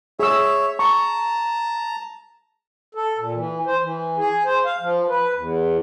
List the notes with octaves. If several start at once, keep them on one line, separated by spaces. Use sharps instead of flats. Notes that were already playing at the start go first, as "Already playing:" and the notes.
G#4 C#5 E5 E6
A5 A#5 C#6
A4
A#2
E3
C5
E3
G#4
C5
F5
F3
B4
E2